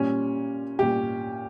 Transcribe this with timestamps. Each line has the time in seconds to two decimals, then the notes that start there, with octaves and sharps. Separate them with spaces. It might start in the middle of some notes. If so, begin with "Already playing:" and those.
Already playing: A#2 G3 C#4
0.79 A#2 G3 G4